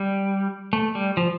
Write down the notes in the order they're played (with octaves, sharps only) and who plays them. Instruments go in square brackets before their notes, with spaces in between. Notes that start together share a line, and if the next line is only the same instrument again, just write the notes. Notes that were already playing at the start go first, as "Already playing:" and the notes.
Already playing: [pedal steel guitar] G3
A3
G3
F3